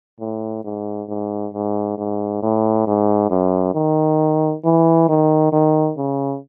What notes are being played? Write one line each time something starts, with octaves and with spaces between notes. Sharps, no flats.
A2
G#2
G#2
G#2
G#2
A2
G#2
F#2
D#3
E3
D#3
D#3
C#3